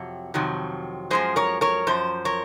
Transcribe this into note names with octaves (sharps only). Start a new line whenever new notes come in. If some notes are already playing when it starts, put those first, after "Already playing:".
Already playing: F2 C3 F#3
F2 C3 D#3 F#3
F#2 F3 G#3 G#4 C5
A#4 C#5
A#4 C#5
F#2 F3 C5
A#4 C#5